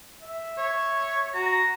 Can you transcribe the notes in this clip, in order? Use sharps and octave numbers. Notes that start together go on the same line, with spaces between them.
E5
C#5
F#4 A#5